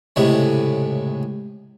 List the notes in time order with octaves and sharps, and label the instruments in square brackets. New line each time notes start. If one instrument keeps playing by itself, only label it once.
[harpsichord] C#2 A2 C3 G#3